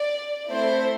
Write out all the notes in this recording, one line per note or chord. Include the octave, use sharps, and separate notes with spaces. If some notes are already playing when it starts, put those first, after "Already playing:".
Already playing: D5
A3 C4 E4 A4 C5